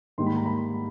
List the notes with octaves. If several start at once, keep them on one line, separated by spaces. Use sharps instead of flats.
G#2 D#3 G3 A#3 C6
B5
A#5
B5